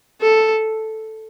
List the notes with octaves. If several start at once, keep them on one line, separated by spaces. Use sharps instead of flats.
A4